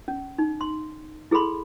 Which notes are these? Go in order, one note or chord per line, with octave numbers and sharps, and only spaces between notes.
C#4
D#4
C6
E4 G#4 A4 B5 C6